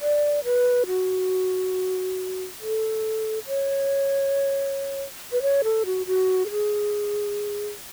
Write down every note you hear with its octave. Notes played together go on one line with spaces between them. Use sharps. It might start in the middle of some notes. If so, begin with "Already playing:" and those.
D5
B4
F#4
A4
C#5
B4
C#5
A4
F#4
F#4
A4
G#4